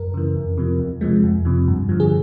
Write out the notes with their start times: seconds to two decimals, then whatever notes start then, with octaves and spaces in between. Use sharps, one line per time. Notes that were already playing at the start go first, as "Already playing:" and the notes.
Already playing: F#2 A#4
0.14 C#3 E3
0.36 F2
0.57 C3 F3
0.80 E2
1.01 C3 F3 G#3
1.24 F2
1.45 C3 F3
1.68 G2
1.89 D3 F3
2.00 G#4